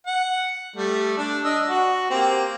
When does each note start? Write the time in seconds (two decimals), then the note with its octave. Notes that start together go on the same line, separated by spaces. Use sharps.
0.07 F#5
0.76 G3 A3
1.18 D4
1.45 D4 D#5 E6
1.68 F#4
2.11 A#3 C4 G4